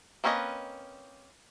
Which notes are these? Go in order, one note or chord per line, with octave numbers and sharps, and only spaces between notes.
A#3 C4 C#4 B4 D#5